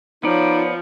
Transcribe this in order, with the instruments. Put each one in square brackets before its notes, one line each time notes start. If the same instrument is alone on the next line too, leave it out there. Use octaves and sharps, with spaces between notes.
[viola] F3 [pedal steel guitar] B3 D5 [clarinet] D#4 [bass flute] C#5